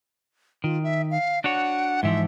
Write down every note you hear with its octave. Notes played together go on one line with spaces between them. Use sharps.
D#3 F4
E5
F5
D4 F#4 C#5 F#5
G#2 E3 F3 E5